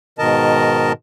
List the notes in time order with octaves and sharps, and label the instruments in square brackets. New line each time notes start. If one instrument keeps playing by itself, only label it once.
[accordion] G#2 B2 D#3 A#4 D#5 A5